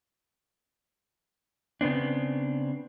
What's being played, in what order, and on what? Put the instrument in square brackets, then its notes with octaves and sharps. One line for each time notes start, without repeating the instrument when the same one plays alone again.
[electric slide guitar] C#3 B3 C4 D4